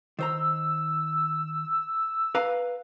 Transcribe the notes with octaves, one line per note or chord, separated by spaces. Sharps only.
D#3 C5 A#5 E6
B4 F5 A#5